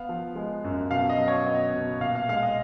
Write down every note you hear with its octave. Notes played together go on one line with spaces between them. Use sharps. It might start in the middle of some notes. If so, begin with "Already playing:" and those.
Already playing: B3 F5
F3
G#3
F#2
B2 F5
D#5
F#3
C#5
B3 D#5
B2
A#2 F5
F5
G#3 F5
D#5